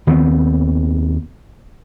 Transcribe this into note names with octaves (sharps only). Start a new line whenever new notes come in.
D#2 D#3 B3 C4